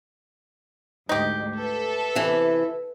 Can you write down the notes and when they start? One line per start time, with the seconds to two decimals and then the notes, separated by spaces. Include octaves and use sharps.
1.09 D2 G#2 D#4 G4 D#5
1.58 A4 B4 E5
2.15 C3 E3